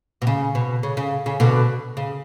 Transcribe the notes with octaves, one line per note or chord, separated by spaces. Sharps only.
B2
C#3
B2
C#3
C#3
C#3
B2 D3
C#3